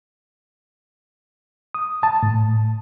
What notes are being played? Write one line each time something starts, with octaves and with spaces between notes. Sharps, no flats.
D#6
A5
A2